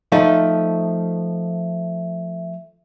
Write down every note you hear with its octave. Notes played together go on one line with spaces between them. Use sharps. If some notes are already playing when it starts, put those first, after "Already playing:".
F3 A3 D#4